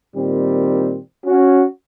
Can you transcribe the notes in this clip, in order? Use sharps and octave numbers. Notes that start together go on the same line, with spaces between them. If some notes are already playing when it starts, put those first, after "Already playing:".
A#2 D#3 G3 C4
C#4 F#4